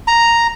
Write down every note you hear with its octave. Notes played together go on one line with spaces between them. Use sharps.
A#5